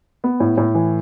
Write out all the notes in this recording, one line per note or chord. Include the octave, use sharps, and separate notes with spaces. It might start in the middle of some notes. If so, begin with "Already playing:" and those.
B3
A2
A2
E3